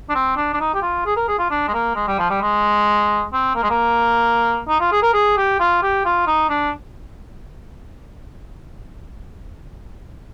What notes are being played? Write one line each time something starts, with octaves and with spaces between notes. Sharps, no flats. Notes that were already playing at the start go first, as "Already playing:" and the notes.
D4
C4
D4
D4
D#4
G4
F4
G#4
A#4
G#4
F4
D4
G#3
A#3
G#3
G3
F3
G3
G#3
C4
A#3
G#3
A#3
D#4
F4
G#4
A#4
G#4
G4
F4
G4
F4
D#4
D4